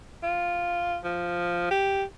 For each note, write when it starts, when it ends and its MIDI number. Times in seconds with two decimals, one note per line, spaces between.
0.23 0.97 65
1.04 1.68 53
1.71 2.04 67